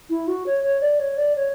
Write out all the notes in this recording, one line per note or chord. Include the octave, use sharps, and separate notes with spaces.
E4
F#4
C#5
C#5
D5
C#5
D5
C#5